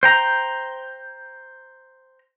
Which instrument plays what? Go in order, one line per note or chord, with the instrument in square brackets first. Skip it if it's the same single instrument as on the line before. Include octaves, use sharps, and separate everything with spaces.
[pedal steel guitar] C5 G5 A#5